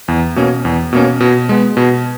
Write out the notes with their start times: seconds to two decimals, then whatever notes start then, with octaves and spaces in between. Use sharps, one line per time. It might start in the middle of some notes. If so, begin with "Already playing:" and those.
0.08 E2
0.36 B2 A#3 C#4
0.65 E2
0.93 B2 A#3 C#4
1.20 B2
1.49 G#3 B3
1.77 B2